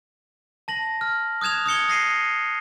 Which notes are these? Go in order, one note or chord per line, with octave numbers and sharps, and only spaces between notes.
A5 A#6 F#7
F6
D#6 F#6 G#6 E7 F7
D#6 G#6 C#7 G7
D#6 A#6 C7 D#7